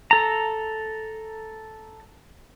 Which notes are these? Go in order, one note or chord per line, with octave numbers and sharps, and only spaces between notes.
A4 A#5